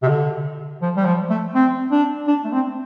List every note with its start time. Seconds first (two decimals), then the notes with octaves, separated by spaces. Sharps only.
0.03 C3
0.08 D3
0.82 F3
0.96 G3
1.05 F3
1.30 A3
1.55 C4
1.91 D4
2.27 D4
2.44 A3
2.52 C4